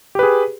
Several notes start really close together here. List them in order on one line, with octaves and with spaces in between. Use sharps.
G4 B4 G#4